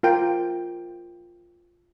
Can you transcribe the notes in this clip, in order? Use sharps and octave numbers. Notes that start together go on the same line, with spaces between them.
F4 A#4 G5